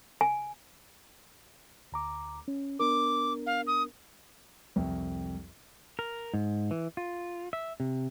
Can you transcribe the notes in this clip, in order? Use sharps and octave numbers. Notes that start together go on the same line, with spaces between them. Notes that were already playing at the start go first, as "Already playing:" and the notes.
G#5
D2 A#5 D6
C#4
B3 D4 A#4 D6
F5
D#6
C2 F2
A#4
G#2
E3
F4
E5
C3